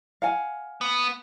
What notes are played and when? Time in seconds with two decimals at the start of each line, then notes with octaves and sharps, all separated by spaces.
0.22 F5 F#5 G#5
0.81 B3